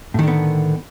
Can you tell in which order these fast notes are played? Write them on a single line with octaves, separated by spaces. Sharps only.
A2 D#3 D3 B3